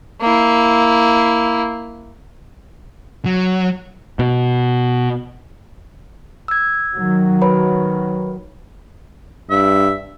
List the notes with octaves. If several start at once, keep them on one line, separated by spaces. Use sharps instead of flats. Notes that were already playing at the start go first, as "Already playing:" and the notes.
A#3 E4
F#3
B2
E6 G#6
D#3 F#3
B4 C#5 B5
G2 E5